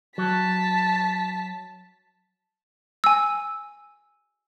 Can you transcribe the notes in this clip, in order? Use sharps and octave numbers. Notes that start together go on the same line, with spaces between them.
F#3 A5 B6
G#5 E6